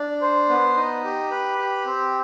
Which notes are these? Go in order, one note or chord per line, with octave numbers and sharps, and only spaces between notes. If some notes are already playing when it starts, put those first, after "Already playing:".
Already playing: D4
C5
B3
D#4
G4
B4
G4
C4